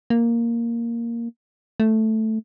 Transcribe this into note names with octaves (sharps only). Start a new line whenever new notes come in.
A#3
A3